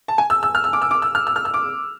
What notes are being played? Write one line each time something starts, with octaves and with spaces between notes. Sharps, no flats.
A5
G#5
E6
E6
F6
E6
D6
E6
D6
E6
F6
E6
F6
E6
D6